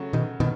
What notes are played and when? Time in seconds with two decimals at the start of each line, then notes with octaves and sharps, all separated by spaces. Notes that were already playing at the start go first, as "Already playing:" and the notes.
Already playing: C#3 F#3 A3
0.13 B2 D#3
0.40 B2 D#3